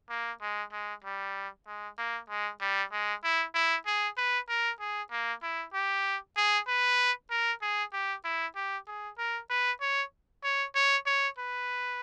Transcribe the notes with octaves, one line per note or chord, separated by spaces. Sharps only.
A#3
G#3
G#3
G3
G#3
A#3
G#3
G3
G#3
E4
E4
G#4
B4
A#4
G#4
A#3
E4
G4
G#4
B4
A#4
G#4
G4
E4
G4
G#4
A#4
B4
C#5
C#5
C#5
C#5
B4